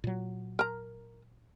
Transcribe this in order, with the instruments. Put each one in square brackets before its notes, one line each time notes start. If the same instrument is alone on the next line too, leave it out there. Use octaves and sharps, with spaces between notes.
[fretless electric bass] A#2 F#3
[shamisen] A#4 A#5